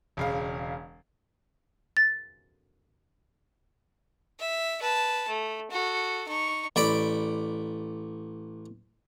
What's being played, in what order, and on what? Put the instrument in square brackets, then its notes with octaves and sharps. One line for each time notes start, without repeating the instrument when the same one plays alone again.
[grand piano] E1 C#3 F5
[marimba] A6
[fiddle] E5
B4 A5
A3
F#4 A4
D#4 C#6
[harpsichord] A1 D5 B5 D6